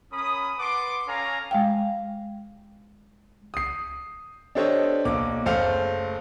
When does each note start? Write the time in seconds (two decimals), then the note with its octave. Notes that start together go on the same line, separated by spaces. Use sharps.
0.12 C#4 A#4 G#5 B5 D#6
0.59 B4 F#5 A5 C6 D6
1.07 C#4 A4 C#5 F5 G#5 A#5
1.51 G#3 F5 G5
3.54 D#6 C7
4.55 D4 G4 A4 C5 C#5 D#5
5.05 B1 A#3 D6
5.46 F#1 A3 C5 F5